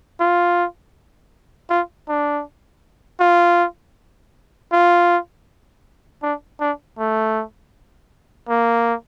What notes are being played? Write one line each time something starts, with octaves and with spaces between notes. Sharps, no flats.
F4
F4
D4
F4
F4
D4
D4
A3
A#3